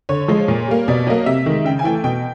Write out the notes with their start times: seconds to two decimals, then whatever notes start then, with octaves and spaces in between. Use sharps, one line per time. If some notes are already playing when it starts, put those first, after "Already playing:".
0.09 D3 C#5
0.28 F3 G#3
0.48 A#2
0.68 G3 A#3
0.88 B2 D5
1.07 F#3 A#3 D#5
1.26 C3 E5
1.46 D#3 G#3
1.65 C#3 G5
1.79 G#5
1.84 E3 A3 G5
2.04 B2 G5